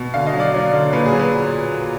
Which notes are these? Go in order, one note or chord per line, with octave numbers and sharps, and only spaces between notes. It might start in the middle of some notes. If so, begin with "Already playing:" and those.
Already playing: B2
D3 F5
D#5
F#3
D5
F#3
D3
A#2 B4
G#4
F#3
B4